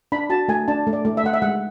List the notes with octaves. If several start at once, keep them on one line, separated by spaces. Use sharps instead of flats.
D4 B5
F#4 A5
A3 G#5
D4 A5
A3
D5
A3
E5
A3 F#5
E5
G#3 F#5